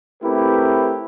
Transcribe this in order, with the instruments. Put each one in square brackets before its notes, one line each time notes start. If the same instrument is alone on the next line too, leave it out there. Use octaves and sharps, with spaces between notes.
[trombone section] A3 C4 E4 G4 A#4 B4